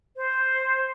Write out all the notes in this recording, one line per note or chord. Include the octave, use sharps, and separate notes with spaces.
C5